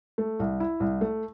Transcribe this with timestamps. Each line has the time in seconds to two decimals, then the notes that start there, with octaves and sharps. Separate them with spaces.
0.18 A3
0.39 C2
0.60 E4
0.80 C2
1.01 A3